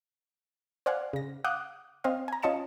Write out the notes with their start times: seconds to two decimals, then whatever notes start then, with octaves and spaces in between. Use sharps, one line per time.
0.86 C5 D5 F5 F#5 G#5
1.13 C#3 A#6
1.44 F5 F#5 D6 D#6 F#6 G6
2.04 C4 C5 D#5 F5
2.28 G#5 A#5
2.42 C#4 F4 D#5 A5 C#7 E7